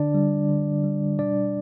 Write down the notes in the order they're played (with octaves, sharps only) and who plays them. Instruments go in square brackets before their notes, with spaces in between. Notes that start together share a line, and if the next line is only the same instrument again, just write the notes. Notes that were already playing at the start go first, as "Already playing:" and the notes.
Already playing: [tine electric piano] D3 D4 D5
G3
D3
G3
B2 D4 D5